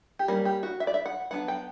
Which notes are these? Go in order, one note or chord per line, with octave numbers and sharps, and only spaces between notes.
G4
G3 A#3 C#4 A#4
G4
F#4
E5
D5
E5
F#5
F#3 B3 D4 F#5
G5